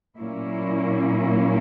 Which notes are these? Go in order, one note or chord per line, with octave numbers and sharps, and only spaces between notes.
A#2 F#3 A#3 C#4 E4